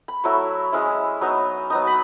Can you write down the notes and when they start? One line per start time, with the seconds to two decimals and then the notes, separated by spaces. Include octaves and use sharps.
0.08 B5
0.24 F#3 A3 E4 C#6
0.72 G#3 C#4 E4
1.21 F#3 B3 D#4
1.70 F#3 B3 D#4 D#6
1.87 B5